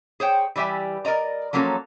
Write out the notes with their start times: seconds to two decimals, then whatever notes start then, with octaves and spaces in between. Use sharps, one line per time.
0.20 G#4 C5 C#5 G5
0.56 E3 G3 G4 E5 G#5
1.05 A#4 D5 D#5 A#5
1.53 F3 F#3 A#3 C#4 F4 A4